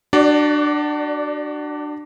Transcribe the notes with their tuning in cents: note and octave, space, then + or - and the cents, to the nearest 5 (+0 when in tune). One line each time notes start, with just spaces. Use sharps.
D4 +20 F#4 +30 D5 -10